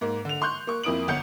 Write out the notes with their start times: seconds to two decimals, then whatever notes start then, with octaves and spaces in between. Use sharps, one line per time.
0.01 G#2 A#3
0.25 D3 F7
0.42 C6 C#6 F#6 G6
0.67 A#3 C#6
0.84 F2 A#3 E4 D#6 D7 F#7
1.08 G1 F#5 G6 C#7